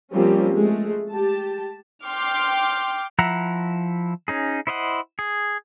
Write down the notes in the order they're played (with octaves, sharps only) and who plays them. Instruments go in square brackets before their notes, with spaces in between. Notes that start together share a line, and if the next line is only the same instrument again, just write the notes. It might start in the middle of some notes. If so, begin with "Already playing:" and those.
[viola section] F3 G3 A#3 C4 C#4 G4
G#3 A3
G4 A5
[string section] G5 C6 D6 F6
[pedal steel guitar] F3 E4 E5 F#5 A#5
C#4 D#4 G#4
E4 C5 D#5 E5 F#5
G#4